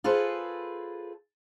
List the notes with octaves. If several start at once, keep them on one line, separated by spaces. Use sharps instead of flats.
F4 G#4 A4 B4 C5